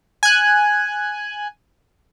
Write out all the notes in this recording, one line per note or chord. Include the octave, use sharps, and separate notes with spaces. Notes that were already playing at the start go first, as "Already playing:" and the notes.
G#5 F#6